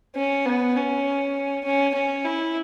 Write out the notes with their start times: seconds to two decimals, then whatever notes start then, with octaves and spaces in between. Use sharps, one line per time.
0.16 C#4
0.46 B3
0.76 C#4
1.64 C#4
1.94 C#4
2.25 E4